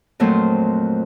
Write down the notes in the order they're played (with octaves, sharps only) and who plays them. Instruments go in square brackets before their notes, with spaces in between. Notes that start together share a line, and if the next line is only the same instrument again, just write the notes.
[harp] F2 A#2 F#3 A3 C5